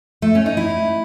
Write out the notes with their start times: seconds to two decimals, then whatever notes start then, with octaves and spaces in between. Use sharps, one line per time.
0.22 A3
0.35 C#4
0.46 D#4
0.57 E4